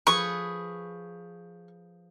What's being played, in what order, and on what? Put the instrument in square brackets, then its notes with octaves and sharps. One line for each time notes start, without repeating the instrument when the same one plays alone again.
[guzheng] F3 G#4 B4 [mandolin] C#6